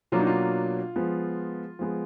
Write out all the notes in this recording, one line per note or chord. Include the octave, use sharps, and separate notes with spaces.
B2 F#3 A#3 D4 F4
D#4
F4
F3 G#3 B3
F3 G#3 B3